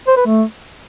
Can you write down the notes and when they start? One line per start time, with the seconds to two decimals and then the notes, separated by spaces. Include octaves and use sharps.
0.08 C5
0.17 B4
0.26 A3